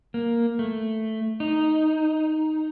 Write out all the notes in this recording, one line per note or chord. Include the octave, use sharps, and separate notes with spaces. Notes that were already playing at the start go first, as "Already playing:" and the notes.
A#3
A3
D#4